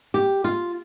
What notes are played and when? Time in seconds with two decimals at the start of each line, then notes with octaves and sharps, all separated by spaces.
0.14 G4
0.44 F4